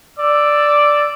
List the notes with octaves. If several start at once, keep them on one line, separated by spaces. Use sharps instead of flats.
D5 E6